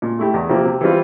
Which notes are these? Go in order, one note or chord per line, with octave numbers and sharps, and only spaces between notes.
A#2
A3 E4 G4
E2
C3 F3 A#3
C3
E3 G3 C4 F4